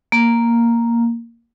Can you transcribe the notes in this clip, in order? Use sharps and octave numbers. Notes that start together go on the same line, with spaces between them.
A#3